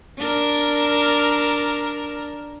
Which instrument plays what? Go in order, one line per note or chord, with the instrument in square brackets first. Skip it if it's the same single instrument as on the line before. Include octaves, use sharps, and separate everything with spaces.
[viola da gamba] D4 A#4